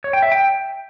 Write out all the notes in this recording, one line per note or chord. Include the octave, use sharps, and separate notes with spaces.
C#5
G5
E5
G5